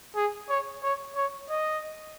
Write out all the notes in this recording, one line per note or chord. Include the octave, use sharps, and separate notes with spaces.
G#4
C#5
C#5
C#5
D#5